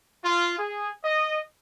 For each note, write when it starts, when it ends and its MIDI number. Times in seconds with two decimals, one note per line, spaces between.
0.24 0.57 65
0.58 0.89 68
1.04 1.40 75